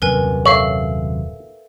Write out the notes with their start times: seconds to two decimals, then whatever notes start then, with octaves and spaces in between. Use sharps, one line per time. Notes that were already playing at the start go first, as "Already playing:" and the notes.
0.02 D#1 F#2 C3 A#4 B4 G#5
0.46 A4 C#5 E5 F5